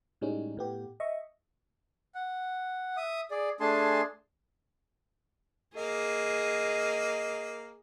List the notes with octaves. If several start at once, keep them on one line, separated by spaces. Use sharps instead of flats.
A2 G3 G#3 C#4 D#4
A2 B3 G4
D#5 E5 C#6
F#5
E5 D#6
G#4 D5
A3 D4 G#4 G#5 A5 C6
A#3 G#4 D#5